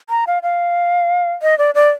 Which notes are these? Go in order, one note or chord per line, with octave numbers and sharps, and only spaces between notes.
A#5
F5
F5
D#5
D5
D5